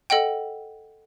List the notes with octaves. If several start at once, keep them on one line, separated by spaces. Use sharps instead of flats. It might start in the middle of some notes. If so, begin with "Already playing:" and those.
A4 D#5 F#5 G5